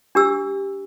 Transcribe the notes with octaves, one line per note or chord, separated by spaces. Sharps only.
D4 G4 E6